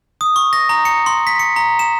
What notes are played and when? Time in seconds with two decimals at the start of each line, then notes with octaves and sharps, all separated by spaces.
0.21 D#6
0.36 C#6
0.53 A#6
0.69 A#5
0.85 C#7
1.06 C6
1.27 B6
1.39 C#7
1.56 A#5
1.79 E7